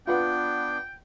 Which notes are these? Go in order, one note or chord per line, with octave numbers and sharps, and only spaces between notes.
B3 D4 F4 B4 F#5 G5